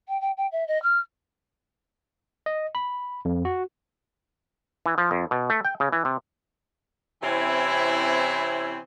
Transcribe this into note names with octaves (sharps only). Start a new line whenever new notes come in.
G5
G5
G5
E5
D#5
F6
D#5
B5
F2
F#4
E3
F3
F2
B2
A3
G5
C#3
E3
C3
C3 E3 C4 C#4 E4